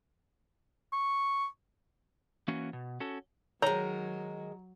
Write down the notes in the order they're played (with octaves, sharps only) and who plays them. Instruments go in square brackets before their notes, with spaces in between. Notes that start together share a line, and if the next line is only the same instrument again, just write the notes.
[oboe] C#6
[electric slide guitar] E3 A#3 C#4 F#4
B2
C#4 F#4 A4
[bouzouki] D#3 G#3 [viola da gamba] F#3 [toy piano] C#5 [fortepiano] A#5